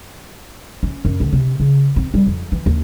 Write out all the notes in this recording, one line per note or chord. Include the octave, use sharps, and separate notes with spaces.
C#4
F#2
D2
C3
C#3
C4
G3
F2
E3
D#2